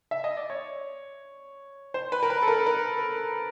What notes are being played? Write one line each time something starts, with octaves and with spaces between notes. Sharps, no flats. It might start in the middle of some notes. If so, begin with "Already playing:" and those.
E5
D#5
D5
C#5
C5
B4
A#4
B4
A4
A#4
A#4